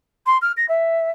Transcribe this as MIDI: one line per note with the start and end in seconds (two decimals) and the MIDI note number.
0.26 0.37 84
0.41 0.52 89
0.57 0.65 94
0.68 1.10 76